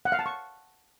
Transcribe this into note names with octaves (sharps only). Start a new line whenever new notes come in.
F#5
F5
A5
C#6